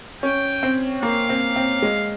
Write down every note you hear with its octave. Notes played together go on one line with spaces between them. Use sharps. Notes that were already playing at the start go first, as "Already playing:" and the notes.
C#4 G5
C4
A#3 F5
C4
C4
G#3